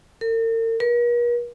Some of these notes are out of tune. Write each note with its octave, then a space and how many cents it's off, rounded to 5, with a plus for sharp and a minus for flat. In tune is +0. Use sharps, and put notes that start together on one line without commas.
A#4 -45
A#4 +45